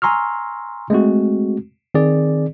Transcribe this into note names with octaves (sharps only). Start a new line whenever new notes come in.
G#5 A#5 C6 C#6 E6 F6
G#3 A3 C4 F#4
D#3 C4 G#4 D5